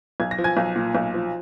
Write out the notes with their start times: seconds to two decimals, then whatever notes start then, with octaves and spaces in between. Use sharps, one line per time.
0.20 B1 G#6
0.31 A#6
0.38 F3
0.44 G#5 G#6
0.57 B1
0.76 A#2
0.95 B1
1.14 F3